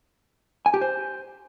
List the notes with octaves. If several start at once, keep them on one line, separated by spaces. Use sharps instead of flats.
G#5
G4
C5